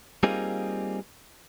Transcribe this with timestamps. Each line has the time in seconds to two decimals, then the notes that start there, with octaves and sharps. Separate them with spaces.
0.23 G3 A#3 C4 D#4 F4 G#4